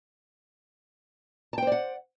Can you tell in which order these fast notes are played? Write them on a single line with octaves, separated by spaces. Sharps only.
A5 G5 C5 D5 F#5